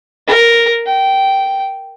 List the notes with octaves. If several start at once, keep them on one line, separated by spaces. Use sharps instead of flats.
A#4
G5